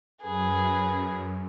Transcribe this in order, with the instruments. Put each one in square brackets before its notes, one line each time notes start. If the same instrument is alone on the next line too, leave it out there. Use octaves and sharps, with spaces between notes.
[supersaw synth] F#2 [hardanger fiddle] G#4 B4